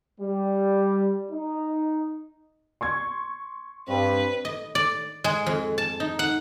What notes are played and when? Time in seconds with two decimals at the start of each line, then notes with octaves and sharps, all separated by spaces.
0.21 G3
1.31 D#4
2.81 C6 C#6 G#6
3.88 G2 C4 B4
4.45 D#5
4.75 D5
5.24 G#3
5.46 F2
5.78 A5
6.00 D#4
6.19 F#5